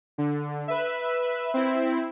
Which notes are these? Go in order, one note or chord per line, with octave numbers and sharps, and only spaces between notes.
D3
B4 E5
C4 E4